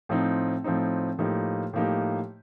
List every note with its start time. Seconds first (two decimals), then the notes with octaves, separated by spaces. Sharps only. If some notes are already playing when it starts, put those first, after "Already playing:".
0.09 A2 F3 C4 D#4
0.64 A2 F3 C4 D#4
1.18 A2 F3 A#3 D#4 G4
1.73 A2 F3 A#3 D#4 G4